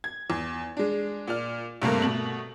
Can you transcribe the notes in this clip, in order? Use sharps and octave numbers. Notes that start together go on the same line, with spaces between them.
G#6
E2
G#3 D4
A#2 D5 F6
G2 C3 A3 A#3
B2 A3 F#7